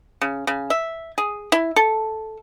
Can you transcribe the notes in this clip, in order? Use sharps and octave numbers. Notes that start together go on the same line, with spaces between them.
C#3
C#3
E5
G#4
E4
A4